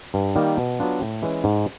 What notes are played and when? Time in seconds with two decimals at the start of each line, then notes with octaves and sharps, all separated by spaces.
0.14 G2
0.36 D#3 G3 A#3
0.57 B2
0.80 F#3 B3 D4 F4
1.01 A2
1.22 E3 G#3 C#4
1.44 G#2